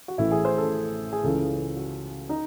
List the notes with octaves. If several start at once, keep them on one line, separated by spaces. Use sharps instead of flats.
F#4
A1 A2 E3 E4
G#4
C5
A4
G#4
C#2 C#3 E3 A4
F#4
D#4